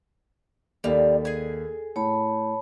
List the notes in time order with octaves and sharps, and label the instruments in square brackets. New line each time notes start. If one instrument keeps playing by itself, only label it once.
[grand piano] D#2 [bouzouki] G3 A#3 [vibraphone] A4
[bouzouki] G#4 G#5
[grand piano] A2 [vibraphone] C#5 A5 B5